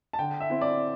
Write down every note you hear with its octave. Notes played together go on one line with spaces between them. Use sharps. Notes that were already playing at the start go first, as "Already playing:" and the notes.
A5
D3 G5
E5
C4 E4
D5